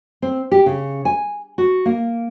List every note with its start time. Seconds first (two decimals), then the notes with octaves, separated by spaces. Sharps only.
0.22 C4
0.52 G4
0.66 C#3
1.05 G#5
1.58 F#4
1.86 A#3